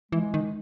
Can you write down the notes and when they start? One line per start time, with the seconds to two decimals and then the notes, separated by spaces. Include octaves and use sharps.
0.12 E3 G#3
0.34 D#3